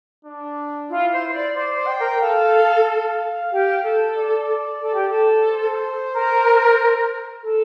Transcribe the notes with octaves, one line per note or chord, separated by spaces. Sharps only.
D4
E4 F4
C5
C5
D5
C5 D5
C5
G5
A#4
A4 F5
F5
G4
A4
D5
A4
G4
A4
C5
A#4
A4